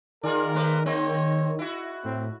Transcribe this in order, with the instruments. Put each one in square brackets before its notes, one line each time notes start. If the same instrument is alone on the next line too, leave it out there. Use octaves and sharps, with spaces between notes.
[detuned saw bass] D#3 [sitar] F4 G#4 D5 [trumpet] A#4
[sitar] A3 B4 C5
[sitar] A#3 C4 D#5 [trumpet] C#5
[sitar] E4 F#4
[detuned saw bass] A2 [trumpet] C4